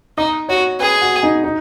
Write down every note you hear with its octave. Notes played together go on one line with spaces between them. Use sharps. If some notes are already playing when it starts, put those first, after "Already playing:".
D#4 D#5
F#4 C#5
G#4 B4
F#4
D#4
D#4